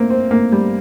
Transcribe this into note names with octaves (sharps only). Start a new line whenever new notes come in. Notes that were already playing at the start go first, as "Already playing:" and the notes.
Already playing: A#3 C4
C4
A#3
G3